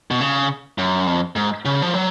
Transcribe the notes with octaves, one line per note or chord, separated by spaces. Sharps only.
B2
C#3
F#2
F2
G#2
C#3
F3
F#3